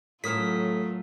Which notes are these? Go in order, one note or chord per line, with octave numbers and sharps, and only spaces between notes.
A2 F#3 A3 C#4 F4 A#4 D#6 B6